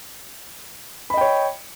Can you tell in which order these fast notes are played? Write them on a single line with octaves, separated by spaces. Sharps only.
B5 D#5 G5 C#5